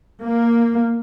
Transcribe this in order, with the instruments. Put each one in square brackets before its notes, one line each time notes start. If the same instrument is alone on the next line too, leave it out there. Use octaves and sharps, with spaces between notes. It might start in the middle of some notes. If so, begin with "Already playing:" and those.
[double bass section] A#3